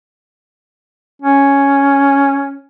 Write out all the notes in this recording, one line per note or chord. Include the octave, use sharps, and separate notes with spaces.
C#4